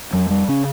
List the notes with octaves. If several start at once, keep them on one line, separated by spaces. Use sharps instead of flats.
F2 F#3
G3
C#3 C#4